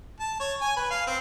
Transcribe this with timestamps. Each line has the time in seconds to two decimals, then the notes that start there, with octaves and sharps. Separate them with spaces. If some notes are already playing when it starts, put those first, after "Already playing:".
0.20 A5
0.40 C#5
0.61 G#5
0.77 B4
0.91 F5
1.07 C4